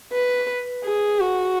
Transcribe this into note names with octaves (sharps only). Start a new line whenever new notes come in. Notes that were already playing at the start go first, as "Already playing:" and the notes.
B4
G#4
F#4